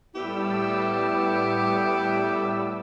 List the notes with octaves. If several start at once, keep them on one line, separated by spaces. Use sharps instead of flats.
A2 G3 B3 E4 G4 E6